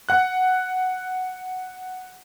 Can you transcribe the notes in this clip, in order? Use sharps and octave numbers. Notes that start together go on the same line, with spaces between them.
F#5 F#6